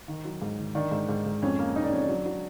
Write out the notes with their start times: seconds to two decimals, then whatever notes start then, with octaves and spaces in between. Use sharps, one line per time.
0.08 D#3
0.25 F#3
0.42 G#2
0.59 D#3
0.75 D#3 D4
0.91 G#2
1.09 G#2
1.26 G#2
1.42 F2 C#4
1.59 A#3
1.76 A#3 D#4
1.84 D4
1.92 F2 C#4
2.02 D4
2.09 F#3
2.26 F#3